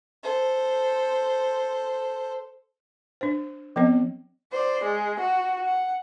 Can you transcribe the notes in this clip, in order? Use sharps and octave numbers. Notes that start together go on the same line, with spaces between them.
A4 C5
D4 C5
F3 B3 C4 A4 C#5 D#5
C5 D5
G#3
F#4
F#5